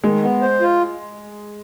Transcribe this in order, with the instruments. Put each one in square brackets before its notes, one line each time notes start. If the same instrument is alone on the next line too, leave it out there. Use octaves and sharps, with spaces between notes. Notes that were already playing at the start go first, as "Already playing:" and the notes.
[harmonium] D#3 [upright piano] G#3
[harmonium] B3
C5
F4